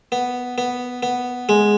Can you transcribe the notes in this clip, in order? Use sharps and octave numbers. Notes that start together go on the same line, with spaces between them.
B3
B3
B3
G#3